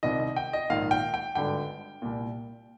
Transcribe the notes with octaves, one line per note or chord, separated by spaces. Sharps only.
C2 C3 D#3 D#5
D#5
G5
D#5
A#1 G#2 D#3 F5
G5
G5
G#1 G2 D3 G5
C2 A#2